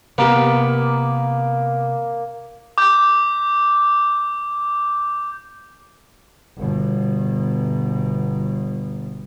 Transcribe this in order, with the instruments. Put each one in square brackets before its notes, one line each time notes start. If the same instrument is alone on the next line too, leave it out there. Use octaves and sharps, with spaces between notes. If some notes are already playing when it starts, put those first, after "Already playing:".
[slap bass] C3 [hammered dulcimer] A#3 [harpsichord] B3 G4
[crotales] D6 G6
[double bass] G1 B2